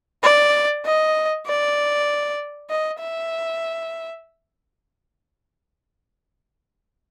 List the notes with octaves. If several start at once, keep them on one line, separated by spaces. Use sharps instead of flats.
D5
D#5
D5
D#5
E5